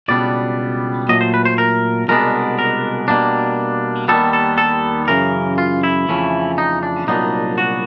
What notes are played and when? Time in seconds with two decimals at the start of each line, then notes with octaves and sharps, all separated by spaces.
0.08 C#2 B2 G3 B3 D4 D5
1.09 A#2 F#3 A3 D#5
1.21 C5
1.34 B4
1.45 C5
1.58 A#4
2.08 C2 B2 G#3 B3 D4 A#4
2.59 A#4
3.08 B2 G3 A#3 D4
4.08 D#2 D#3 G3 B3 A4
4.33 A4
4.58 A4
5.08 F#2 C#3 E3 A#4
5.58 F4
5.83 E4
6.09 F2 C#3 E3 A3 C#4
6.58 D#4
6.83 D4
7.07 C2 A#2 F#3 B3 D4 D#4
7.58 F#4